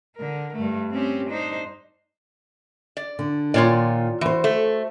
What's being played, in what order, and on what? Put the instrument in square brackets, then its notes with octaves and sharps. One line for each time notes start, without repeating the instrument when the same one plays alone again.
[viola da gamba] D3 A#4
G2 A3
C4 C#4 G4
D4 D#4 C5
[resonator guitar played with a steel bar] D5
[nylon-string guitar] D3
[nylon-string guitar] A#2 D#3 [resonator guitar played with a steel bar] F4 C#5 D5
[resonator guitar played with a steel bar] E3 [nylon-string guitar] F#4 C5
[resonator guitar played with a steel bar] A3